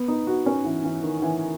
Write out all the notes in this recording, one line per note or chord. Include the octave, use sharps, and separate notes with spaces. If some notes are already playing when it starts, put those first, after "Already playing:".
Already playing: B3
D#4
F#4
C#4
E3
E3
D#3
E3